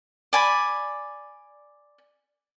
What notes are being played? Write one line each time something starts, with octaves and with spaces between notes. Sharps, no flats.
D5 G#5 B5